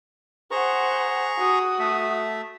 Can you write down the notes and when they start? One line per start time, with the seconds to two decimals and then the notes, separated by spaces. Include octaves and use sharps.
0.51 G#4 C5 F#5 A#5 C#6
1.38 F#4 D#6
1.79 A3 E5